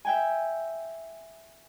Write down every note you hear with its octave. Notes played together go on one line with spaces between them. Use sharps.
E5 G5 G#5